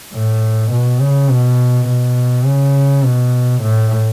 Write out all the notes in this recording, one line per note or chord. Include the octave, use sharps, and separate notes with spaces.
A2
B2
C#3
B2
B2
C#3
B2
A2